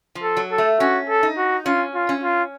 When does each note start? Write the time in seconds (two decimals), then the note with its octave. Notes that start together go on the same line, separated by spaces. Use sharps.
0.15 F3
0.23 A4
0.37 F#3
0.51 A4
0.58 A3
0.80 C#4 F#4
1.09 A4
1.23 D#4
1.37 F#4
1.66 C#4 F4
1.95 F4
2.09 C#4
2.23 F4